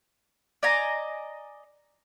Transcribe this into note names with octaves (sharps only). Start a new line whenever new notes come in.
D5 D#5 G#5 A#5